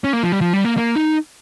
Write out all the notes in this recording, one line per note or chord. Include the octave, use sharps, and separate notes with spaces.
C#4
A#3
F3
G3
F3
G3
A#3
A#3
D#4